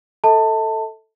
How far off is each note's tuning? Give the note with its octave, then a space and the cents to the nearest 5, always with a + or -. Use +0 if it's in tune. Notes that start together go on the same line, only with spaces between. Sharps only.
A4 +5 E5 -45 A5 +20